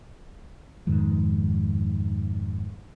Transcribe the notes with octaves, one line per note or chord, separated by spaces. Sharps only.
F2 G#2 D#3